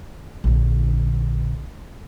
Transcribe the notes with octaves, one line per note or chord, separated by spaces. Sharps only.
A#1 D3